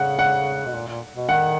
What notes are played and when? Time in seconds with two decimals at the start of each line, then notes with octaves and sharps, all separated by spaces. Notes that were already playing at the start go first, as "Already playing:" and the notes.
Already playing: C#3 F#5
0.19 F#5
0.66 B2
0.74 A#2
0.87 A#2
1.15 B2
1.29 D#3 F#5